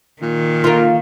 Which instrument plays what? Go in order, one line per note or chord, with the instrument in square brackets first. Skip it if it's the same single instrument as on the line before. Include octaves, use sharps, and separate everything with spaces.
[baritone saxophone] A#2 [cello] D#3
[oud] A#3 F4